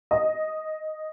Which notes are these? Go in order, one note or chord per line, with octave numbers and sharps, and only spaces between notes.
D#5